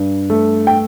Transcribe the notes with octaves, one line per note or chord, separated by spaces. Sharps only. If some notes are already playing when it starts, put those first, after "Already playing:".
Already playing: G2
A3
G5